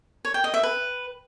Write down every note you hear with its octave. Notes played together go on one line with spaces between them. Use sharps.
C#5
G5
D#5
E5
B4